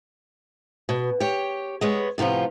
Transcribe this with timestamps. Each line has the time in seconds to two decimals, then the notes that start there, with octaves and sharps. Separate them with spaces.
0.89 B2
1.20 G4 C#5
1.81 G#3 B3 C#5
2.18 A2 C3 F3 B3 F4